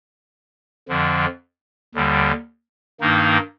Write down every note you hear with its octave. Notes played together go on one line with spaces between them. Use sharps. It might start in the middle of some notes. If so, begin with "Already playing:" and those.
F2 D3 F3
D#2 D3 G3
G2 D#3 A#3 D#4